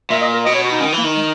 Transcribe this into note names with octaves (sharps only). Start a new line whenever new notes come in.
A#2 E5
D#5
A#4
B2 D#5
C#5
F#4
D#4
D#3 C#4
E3
A#3
D#3
G#3